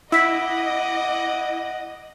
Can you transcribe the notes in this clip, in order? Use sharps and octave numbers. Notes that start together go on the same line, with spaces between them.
E4 D#5 F#5 D6 E6 B6